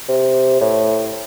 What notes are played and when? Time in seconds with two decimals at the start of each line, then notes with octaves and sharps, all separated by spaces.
0.09 C3
0.61 A2